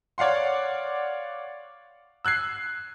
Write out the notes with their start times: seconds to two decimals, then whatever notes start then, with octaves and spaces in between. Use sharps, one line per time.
0.18 C#5 D5 F5 F#5 C6
2.25 E6 F#6 G#6 C7